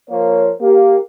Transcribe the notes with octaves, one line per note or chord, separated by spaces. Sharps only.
F3 A#3 A#4 C5 C#5
A#3 G4